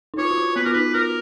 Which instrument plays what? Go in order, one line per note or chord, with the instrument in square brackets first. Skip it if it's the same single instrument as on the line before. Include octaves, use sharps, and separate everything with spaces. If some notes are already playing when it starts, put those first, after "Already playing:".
[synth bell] D#4
[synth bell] F4 [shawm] C#5
[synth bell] F#4
F4
[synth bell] B3 [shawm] B4
[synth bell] F4 [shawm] A#4
[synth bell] D#4 [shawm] B4
[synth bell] F4 [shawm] A#4